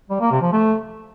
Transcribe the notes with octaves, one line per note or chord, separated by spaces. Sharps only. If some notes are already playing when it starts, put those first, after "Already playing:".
G3
A#3
C3
F3
A3